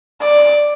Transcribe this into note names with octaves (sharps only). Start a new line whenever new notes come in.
D5